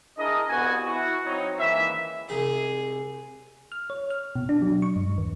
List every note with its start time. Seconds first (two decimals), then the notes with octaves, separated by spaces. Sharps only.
0.18 D4 E4 G#4 A#4 D#5
0.50 C2 B3 F#4 G#5
0.85 E4 F#4
1.26 F#3 C4 D#4 C#5
1.59 C#2 D#3 E3 A#3 E5
2.29 C2 G#3 D#4 G#4
3.72 F6
3.90 C#5
4.10 F6
4.36 B2
4.49 D4
4.62 F#3
4.82 C#6
4.96 G2
5.18 D#2